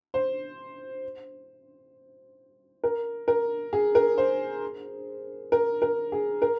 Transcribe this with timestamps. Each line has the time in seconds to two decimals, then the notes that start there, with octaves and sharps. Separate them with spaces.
0.14 C5
2.84 A#4
3.28 A#4
3.73 G#4
3.95 A#4
4.18 C5
5.52 A#4
5.82 A#4
6.12 G#4
6.42 A#4